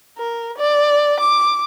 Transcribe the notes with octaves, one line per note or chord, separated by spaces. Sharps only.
A#4
D5
D6